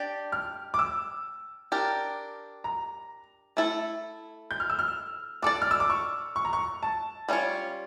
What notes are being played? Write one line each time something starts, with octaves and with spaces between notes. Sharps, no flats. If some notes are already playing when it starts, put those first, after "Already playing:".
Already playing: D4 G4 D5
F6
D6
E6
D4 G4 A#4
A#5
A3 E4 A4
G6
F6
E6
F6
D4 A4 D5 D6
F6
E6
D6
C#6
C#6
A#5
C#6
A5
G3 C#4 F4 C#5